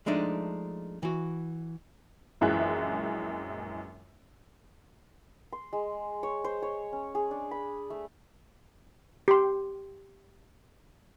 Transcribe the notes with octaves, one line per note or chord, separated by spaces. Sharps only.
F3 G#3 A3 D4 D#4
E3 F#4
A#1 F#2 E3 G#3 E5 F#6
C6
G#3
C#5
C5
C#5
C#4
G#4
D4
B5
A3
G4 C6